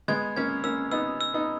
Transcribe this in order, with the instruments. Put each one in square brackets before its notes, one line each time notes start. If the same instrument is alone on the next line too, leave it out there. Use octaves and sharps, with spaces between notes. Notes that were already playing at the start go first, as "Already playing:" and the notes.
[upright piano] G#3 B3 [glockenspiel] G#6
[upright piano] A#3 C#4 [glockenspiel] G#6
[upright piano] A#3 C#4 [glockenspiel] E6
[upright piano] B3 D#4 [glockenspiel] E6
[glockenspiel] E6
[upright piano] B3 D#4